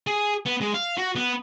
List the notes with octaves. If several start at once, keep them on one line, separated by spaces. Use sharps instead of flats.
G#4
B3
G#3
F5
F#4
B3